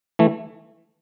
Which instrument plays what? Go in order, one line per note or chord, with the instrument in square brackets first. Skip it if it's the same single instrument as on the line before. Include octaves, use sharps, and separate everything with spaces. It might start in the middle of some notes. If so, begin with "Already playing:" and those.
[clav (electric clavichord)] E3 A3